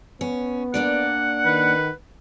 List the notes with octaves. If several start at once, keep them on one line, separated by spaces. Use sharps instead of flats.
B3 C#4
A#3 D4 D5 F#5
D#3 B4